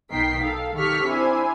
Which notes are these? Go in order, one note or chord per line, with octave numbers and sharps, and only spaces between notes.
B1 B2 D#3 G5 B6 C7
A4 F5
D#3 G4 A4 C#6 F6 B6
C4 D4 E4 C5 G#5